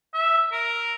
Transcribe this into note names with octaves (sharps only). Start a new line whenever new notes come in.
E5
A#4